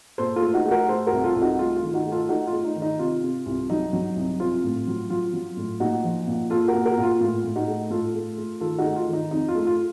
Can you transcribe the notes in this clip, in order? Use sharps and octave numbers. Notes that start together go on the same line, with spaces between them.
A#2 A4 C5
F4 A4
A3
D#4 F#4
A3
F#4 A#4
A3 A4 C5
F#4 A#4
C2
F4 A4
C2
D#4 F#4
A3 F4
F4
D#3
D#4 F#4
A3
F4 A4
A3 D#4 F#4
F4
A3
D#4
D#3
D#4
C3 F4
C3
C2
F#3 D#4
F#3
C2
C4 F4
A2
F#3
F#3 F4
F#3
A2
A#2 D#4 F#4
F3
A#2
A#2 F4 A4
F#4 A#4
A#2
F#4 A#4
A#2
F4
A2 F4
A2
D#4 F#4
A3
A2 F4 A4
A3
A3
D#3 F4 A4
D#4 F#4
A3
F4
D#3 D#4
F2 D#4
F4
A3
F4